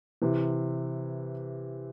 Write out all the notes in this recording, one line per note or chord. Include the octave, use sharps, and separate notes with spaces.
C3 E3